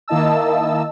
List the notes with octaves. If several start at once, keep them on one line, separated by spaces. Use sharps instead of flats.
D#3 A#3 E4 D#5 A5 E6